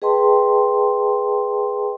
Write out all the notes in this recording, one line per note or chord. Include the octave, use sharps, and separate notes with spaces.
G#4 B4 D#5 G5 A5 C6